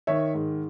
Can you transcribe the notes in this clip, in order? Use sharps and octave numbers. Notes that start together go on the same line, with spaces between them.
D#3 C#5 E5
G#2